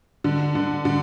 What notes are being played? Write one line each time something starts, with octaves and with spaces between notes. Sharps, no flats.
D3
D3
D3